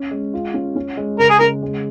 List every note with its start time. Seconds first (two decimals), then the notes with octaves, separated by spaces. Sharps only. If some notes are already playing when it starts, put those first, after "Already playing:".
Already playing: C#4
0.11 G#3
0.34 F4
0.54 C#4
0.76 C#4
0.97 G#3
1.19 C#3 A#4
1.30 G#4
1.39 C#4 A#4
1.63 G#3